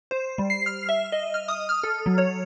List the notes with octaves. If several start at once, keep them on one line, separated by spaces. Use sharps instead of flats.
C5
G3
C7
F6
E5
D#5
F6
D#6
F6
A4
F#3
C#5